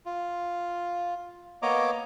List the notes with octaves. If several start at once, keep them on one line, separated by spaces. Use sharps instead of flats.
F4
A#3 B3 C#5 D#5 A#5 D6